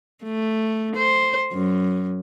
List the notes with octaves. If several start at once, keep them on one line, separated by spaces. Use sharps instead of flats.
A3
C5
F#2